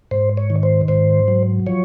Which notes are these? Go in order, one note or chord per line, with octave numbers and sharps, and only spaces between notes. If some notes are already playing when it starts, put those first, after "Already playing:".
G#2 C5
C#5
D#3
C5
G#2 C5
F#3
F3 C#5